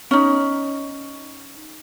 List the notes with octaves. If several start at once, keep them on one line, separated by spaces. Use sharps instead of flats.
C#4 D#4